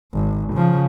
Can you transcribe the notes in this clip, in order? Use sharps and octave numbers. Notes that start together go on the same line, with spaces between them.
G#1
C#3 F3